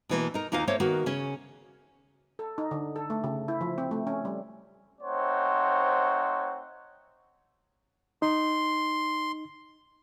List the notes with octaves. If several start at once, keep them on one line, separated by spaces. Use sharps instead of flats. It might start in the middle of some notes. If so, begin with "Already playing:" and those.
B2 E3 A#3
D#4 A#4
D#2 A#3 D#4 F4 F5
A3 A#3 C5 C#5 F5
D#3 A#3 B3 F#4
C#3 C#4
A4
D#4
D3
A4
A3
C#3
E4
F3
C4
A3
C#4
G3
A3 C4 D#4 C5 C#5 F#5
D#4 C6